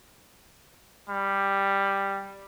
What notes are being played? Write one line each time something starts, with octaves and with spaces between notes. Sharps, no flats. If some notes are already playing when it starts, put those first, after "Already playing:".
G3